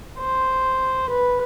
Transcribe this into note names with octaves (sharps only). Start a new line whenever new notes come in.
C5
B4